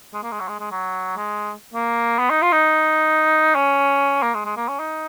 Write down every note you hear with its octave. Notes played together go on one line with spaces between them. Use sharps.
G#3
A#3
G#3
F#3
G#3
G#3
F#3
G#3
A#3
B3
D#4
F4
D#4
C#4
A#3
G#3
G#3
A#3
C#4
D#4